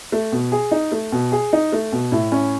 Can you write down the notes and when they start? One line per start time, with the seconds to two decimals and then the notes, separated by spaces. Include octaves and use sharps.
0.12 A3
0.32 B2
0.52 G#4
0.71 D#4
0.92 A3
1.12 B2
1.32 G#4
1.53 D#4
1.72 A3
1.92 B2
2.12 A2
2.32 C#4